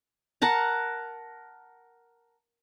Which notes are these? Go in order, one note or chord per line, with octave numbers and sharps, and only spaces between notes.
A#4 F#5 A5 A#5